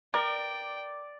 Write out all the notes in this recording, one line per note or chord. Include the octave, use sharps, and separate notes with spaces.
A#4 D5 G5